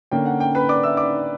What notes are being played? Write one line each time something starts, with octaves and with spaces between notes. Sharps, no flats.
D3 A#3 C#4 G5
F#5
G5
B4 B5
D5 D6
E5 E6
D5 D6